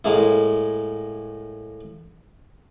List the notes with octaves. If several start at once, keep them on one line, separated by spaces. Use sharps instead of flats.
A2 G#3 A#3 E4